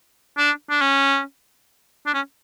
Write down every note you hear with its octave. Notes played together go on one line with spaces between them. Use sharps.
D4
D4
C#4
D4
C#4